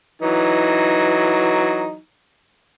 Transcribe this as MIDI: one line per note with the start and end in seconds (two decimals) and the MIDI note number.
0.22 1.97 52
0.22 1.97 54
0.22 1.97 63